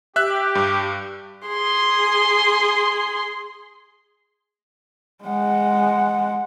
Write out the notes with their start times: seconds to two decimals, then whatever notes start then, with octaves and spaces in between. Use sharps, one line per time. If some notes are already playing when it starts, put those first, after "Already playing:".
0.16 G4 E5 F#6
0.55 G2
1.47 G#4 C6
5.24 G#3 F#5